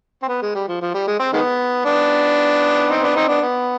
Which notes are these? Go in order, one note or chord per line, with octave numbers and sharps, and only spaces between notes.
C4
B3
G#3
G3
F3
F3
G3
G#3
C4
D#3 G#3 B3
B3 D4
C4 D#4
B3 D4
C4 D#4
B3 D4
B3